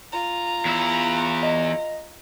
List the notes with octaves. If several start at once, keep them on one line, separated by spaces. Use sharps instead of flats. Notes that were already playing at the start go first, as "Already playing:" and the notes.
F4 A#5
E2 E4
D#5